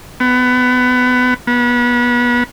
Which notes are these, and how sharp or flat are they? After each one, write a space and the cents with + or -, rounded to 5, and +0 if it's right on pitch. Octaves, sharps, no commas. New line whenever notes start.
B3 +20
B3 -30